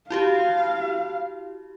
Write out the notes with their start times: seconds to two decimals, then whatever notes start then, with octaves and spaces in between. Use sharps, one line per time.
0.10 E4 F#4 G4 F5